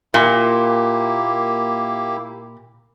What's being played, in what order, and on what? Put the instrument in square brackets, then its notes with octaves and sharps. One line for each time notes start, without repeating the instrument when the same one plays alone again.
[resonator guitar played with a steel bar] A#2 [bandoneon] A#3 E4 G4